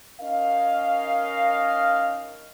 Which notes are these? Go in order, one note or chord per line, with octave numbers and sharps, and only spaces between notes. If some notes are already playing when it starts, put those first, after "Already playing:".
C#4 D#4 A#4 D#5 F5